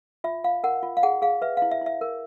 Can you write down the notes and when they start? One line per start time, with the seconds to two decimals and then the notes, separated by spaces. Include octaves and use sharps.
0.24 F4 E5
0.44 F4 F5
0.64 A#4 F#5
0.83 F4
0.97 F5
1.03 G#4 F#5
1.22 G#4 F5
1.42 B4 E5
1.57 E4 F5
1.72 E5
1.82 E4 E5
2.01 A#4